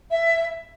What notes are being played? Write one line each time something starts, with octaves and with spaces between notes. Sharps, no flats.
E5